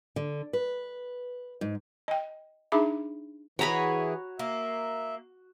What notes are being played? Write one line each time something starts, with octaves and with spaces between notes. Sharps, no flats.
D3
B4
G#2
D#5 G5
D4 D#4 G#4 E5 B5 D6
E3 E4 F#4 G#4 C#5 A#5 B5
A#3 E5